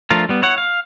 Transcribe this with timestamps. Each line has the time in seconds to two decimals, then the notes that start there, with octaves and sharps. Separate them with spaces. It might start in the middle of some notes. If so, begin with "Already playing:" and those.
0.10 F3 A3 D4 F4 A#4
0.29 G3 B3
0.42 E4 C#5 F#5
0.58 F5